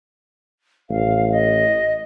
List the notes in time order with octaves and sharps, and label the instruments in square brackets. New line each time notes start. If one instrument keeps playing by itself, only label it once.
[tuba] A1 [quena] F5
[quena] D#5